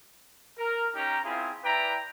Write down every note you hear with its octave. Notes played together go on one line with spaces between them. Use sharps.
A#4
C#4 D#4 G4 A#5
C4 E4 F4 G#4
E4 B4 D5 G5 A#5